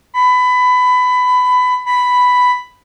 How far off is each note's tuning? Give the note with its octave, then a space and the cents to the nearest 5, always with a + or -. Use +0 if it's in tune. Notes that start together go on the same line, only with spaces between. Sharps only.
B5 +20
B5 +5